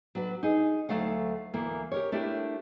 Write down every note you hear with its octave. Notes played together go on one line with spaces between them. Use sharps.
F#3 D4 F#4 B4
D#4 G#4
D2 G2 F#3 A3 F5 F#5
D2 E3 A#3
G4 A#4 C#5
A3 D4 E4 G4 A#4